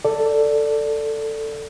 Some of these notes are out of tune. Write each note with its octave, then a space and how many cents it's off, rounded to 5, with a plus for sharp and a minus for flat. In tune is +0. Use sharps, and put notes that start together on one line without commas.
A4 +10 D5 +0